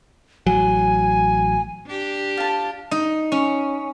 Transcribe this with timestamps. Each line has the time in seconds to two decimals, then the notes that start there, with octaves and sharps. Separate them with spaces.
0.47 A1 F#3 G#5
1.86 D4 G4
2.37 F4 A5
2.91 D#4
3.32 C#4